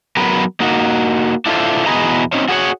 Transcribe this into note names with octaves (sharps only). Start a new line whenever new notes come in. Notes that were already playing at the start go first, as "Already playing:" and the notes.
F#3 B3 A#4 B4
A#3 D#4 F#4
D4 E4 F4 A4 C5
E2 B2 G#4 B4 D#5 A#5
C4 C#4 D#4
F#4 G#4 B4 C#5 F#5